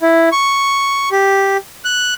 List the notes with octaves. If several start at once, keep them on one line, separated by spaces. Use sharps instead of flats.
E4
C#6
G4
F#6